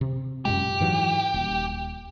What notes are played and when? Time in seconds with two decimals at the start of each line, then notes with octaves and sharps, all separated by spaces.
0.01 C3
0.45 F#2 A#2 G#3 G4
0.80 G#2 E3 F#3
1.34 D#1